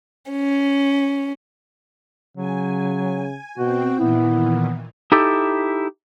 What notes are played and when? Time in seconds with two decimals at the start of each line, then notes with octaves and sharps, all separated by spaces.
0.31 C#4
2.37 C#3 F#3 G#5
3.58 B2 C4 F#4 G5
3.99 A#2 D#3 E3 B3 E4
5.12 D#4 E4 G4 A4